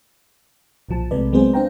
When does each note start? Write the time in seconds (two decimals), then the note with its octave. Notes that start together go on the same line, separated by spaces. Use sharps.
0.89 B1 A#2 F3 A5
1.11 B1 C3 G#3 A3 B4 D5
1.33 F#3 G#3 B3 C4 G#4 C5
1.54 D4 C5 F5 G5 A#5